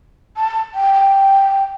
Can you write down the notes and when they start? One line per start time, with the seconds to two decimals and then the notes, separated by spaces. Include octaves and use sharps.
0.37 A5
0.74 G5
0.93 G5